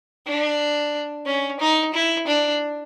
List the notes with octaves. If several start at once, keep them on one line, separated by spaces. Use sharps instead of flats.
D4
C#4
D#4
E4
D4